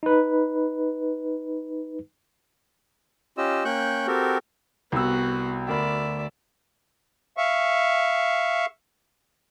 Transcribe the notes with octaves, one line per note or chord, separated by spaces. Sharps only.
D#4 B4
C#4 F4 G4 D#5 E6
A#3 C#4 G5 C#6 F#6 G6
C4 F#4 G4 A4 A#4
C2 B3 F#4 E6
D2 A#4 D5 E5 B5
E5 F5 C#6